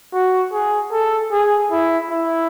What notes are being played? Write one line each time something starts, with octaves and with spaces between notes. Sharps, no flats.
F#4
G#4
A4
G#4
E4
E4